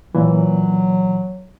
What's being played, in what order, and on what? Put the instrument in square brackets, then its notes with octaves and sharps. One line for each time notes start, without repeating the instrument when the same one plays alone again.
[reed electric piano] A#2 E3 [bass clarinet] F#3